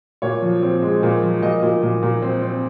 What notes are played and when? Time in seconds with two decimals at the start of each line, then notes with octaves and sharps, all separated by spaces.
0.22 A#2 C#5
0.42 F3
0.62 C4
0.82 G#3
1.03 A#2
1.23 F3
1.42 A#2 D#5
1.63 A#2
1.83 A#2
2.02 A#2
2.22 C4
2.42 C4